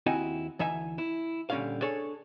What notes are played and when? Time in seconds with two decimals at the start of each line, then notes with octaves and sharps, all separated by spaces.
0.06 D#2 C4 D#4 E4 F#4 G#5
0.59 D2 E3 D#4 E5 G#5
0.98 E4
1.50 A#2 D3 G3 C#4 D4 F5
1.82 D4 G#4 A4 C#5